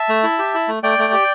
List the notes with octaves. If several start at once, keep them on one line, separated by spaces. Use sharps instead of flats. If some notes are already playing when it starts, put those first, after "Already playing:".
Already playing: E5 A5
A3
E4
G4
E4
A3
A3 D5 G5
A3
G4